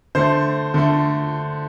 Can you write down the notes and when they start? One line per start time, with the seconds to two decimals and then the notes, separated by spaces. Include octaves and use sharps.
0.15 D3 A3 C5
0.74 D3 A3